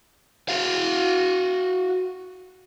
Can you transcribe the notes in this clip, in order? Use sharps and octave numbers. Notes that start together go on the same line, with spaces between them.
F#4 F5